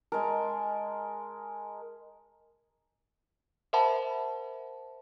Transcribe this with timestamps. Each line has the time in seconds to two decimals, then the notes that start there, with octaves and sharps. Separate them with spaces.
0.12 G#3 A#4 A5
3.73 A#4 C5 E5 F#5 A5 B5